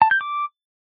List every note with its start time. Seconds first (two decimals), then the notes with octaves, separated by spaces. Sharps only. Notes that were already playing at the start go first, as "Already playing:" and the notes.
0.02 A5
0.11 G6
0.21 D6